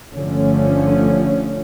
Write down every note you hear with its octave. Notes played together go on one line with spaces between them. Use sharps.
G1 D3 F3 A3 C#4